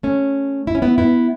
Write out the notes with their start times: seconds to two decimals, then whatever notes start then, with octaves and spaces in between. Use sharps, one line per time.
0.03 A3 C#4
0.67 E4
0.75 C#4
0.82 B3 E4
0.98 B3 E4